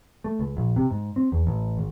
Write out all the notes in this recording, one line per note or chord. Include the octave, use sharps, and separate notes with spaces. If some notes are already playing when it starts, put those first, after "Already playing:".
A3
C#2
A#1
C3
G#2
C4
E2
A1
G#1